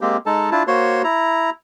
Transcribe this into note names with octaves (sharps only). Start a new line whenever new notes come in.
G#3 A#3 C4 G4
G#3 D#4 A4 A5
D4 E4 F4 A5
A#3 F#4 C5 C#5 C6
E4 A#5